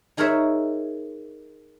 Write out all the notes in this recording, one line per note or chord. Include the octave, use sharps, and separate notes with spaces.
D#4 G#4 A#4 C5 C#5 E5